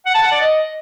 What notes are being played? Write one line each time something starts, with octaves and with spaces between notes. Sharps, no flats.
F#5
A5
F#5
D5
D#5